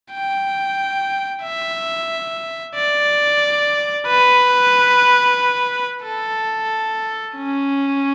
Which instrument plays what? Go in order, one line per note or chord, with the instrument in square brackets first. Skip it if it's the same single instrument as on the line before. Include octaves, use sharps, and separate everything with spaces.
[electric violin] G5
E5
D5
B4
A4
C#4